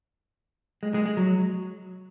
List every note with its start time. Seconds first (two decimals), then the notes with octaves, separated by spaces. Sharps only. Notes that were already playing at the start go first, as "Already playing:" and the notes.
0.83 G#3
0.94 G#3
1.06 G#3
1.17 F#3